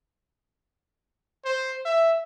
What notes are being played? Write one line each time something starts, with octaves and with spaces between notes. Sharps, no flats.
C5
E5